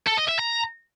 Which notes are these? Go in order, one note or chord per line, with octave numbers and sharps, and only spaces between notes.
A4
D#5
E5
A#5